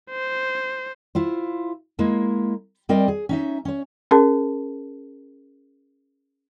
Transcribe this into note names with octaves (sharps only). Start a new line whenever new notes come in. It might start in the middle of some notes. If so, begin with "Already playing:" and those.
C5
E4 F4 C5
G#3 A#3 E4
G3 C4 A#4 D5 D#5
G#4
C#4 D#4 E5
C#4 C#5
C#4 G#4 A#4 A5